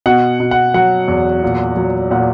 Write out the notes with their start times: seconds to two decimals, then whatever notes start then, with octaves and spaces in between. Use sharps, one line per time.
0.06 B2 F#5
0.40 B2
0.51 F#5
0.74 F#3 F#5
1.08 E2
1.43 A#2
1.77 F#3
2.11 A#2 F#5